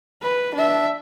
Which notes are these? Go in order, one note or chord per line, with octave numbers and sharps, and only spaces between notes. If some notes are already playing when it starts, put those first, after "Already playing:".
B4
D4 E5